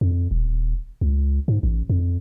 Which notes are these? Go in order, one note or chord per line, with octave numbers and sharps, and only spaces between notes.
F2
D#1
C#2
G#2
A1
F2